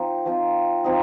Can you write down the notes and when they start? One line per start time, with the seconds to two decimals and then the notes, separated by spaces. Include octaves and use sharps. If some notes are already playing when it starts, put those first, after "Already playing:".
Already playing: F3 C4 D#4
0.26 F3 C4 D#4
0.84 F3 C4 D#4